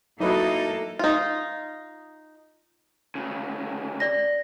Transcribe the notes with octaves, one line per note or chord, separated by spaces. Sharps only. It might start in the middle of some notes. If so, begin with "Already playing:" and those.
F#3 A#3 D#4 E4 F#4 A4 B4 D#5
D#4 F4
D2 C#3
D5 A#6